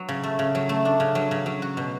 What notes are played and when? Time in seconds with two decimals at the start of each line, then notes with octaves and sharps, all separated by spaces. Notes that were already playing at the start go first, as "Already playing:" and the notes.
Already playing: F#3
0.09 C#3
0.23 A3
0.39 C#3
0.55 F#3
0.69 A3
0.85 D4
1.00 C#3
1.15 F#3
1.31 C#3
1.46 F#3
1.62 F#4
1.77 B2